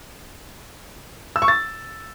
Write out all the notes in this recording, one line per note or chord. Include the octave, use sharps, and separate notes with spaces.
E6
C#6
A6